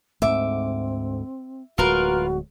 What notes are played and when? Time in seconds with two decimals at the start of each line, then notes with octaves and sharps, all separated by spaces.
0.22 D2 G#2 A3 C4 E5 D6
1.78 D1 G#3 F4 F#4 A#4 B4